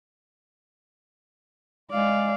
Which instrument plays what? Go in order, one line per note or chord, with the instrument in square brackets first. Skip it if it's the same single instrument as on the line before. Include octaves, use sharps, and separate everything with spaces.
[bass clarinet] G#3 [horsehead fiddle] D5 F5